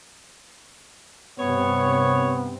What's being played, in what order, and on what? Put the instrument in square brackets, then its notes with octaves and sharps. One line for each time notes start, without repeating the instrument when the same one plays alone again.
[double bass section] G2 C3 C4 [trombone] B3 [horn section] C#5